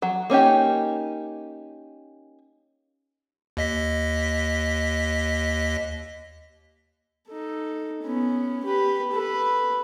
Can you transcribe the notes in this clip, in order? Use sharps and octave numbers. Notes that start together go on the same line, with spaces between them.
F#3
A#3 C#4 D#4 G4
D#2 D#5 B6
D#4 A4
B3 C#4
G4 B4
A4 B4